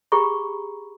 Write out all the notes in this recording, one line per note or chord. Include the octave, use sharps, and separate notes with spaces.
G4 G#4 A#5 B5 C#6